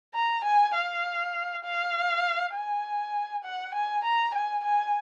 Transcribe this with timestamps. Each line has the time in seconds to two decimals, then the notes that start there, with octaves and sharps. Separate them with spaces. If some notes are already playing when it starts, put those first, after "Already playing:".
0.14 A#5
0.44 G#5
0.75 F5
1.64 F5
2.55 G#5
3.44 F#5
3.74 G#5
4.04 A#5
4.34 G#5
4.64 G#5